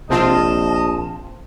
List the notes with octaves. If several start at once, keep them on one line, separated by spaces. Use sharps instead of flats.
A#1 C3 C4 F4 D#5 A5